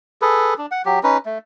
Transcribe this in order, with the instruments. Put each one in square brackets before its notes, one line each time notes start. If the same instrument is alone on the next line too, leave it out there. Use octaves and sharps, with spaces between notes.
[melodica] G#4 A4 B4
D4
F#5
F#3 G4
C#4 D#4 B4
A3